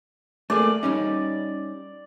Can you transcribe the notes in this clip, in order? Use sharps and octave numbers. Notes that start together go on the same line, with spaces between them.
A3 A#3 G#4 D5
G3 C#4 D#4